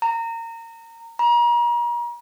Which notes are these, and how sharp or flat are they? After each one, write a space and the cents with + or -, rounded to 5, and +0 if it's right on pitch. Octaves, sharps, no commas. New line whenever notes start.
A#5 -25
A#5 +40